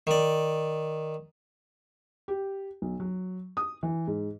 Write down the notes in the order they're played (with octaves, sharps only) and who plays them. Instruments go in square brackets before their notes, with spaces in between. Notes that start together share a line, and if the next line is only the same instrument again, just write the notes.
[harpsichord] D#3 D5
[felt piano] G4
B1
F#3
D#6
E3
G#2